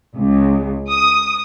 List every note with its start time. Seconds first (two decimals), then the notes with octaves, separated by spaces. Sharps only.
0.15 C#2
0.88 D#6